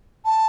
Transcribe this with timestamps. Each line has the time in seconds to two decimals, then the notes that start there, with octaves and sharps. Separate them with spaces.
0.25 A5